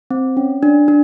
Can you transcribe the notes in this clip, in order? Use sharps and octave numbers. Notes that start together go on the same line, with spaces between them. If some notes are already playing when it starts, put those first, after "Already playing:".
C4
C#4
D4
D4